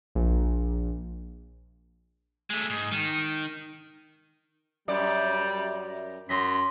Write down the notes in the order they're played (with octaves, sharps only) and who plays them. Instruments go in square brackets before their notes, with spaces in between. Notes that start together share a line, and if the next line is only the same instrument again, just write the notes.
[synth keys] A#1
[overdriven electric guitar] G#3 A3
G#2
D#3
[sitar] F#2 D5 [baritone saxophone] G3
[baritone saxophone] F#2 [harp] C6 A#6 B6